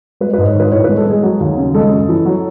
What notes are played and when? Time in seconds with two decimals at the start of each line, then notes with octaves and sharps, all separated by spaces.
0.21 G#3 B4
0.33 G#2 B4
0.46 C#5
0.55 D#3 B4
0.72 A2 C#5
0.84 G#3 B4
0.97 A4
1.06 G#3 G#4
1.23 F#3
1.40 D#2
1.57 C#3
1.74 G#3 A4
1.91 F#2
2.09 E3
2.26 F#3